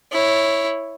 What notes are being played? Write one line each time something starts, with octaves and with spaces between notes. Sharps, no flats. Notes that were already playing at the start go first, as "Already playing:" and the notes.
E4 C#5